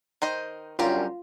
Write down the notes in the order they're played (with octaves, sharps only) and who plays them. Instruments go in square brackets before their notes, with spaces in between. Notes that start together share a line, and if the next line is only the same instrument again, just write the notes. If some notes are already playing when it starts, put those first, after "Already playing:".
[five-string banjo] D#3 C5 D#5
[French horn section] F#2 D3 G3 [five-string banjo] C#4 G4 A#4 [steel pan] F4